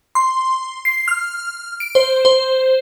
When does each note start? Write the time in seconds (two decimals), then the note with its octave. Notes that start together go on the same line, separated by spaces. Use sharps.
0.15 C6
0.85 C7
1.08 F6
1.80 D7
1.95 C5
2.25 C5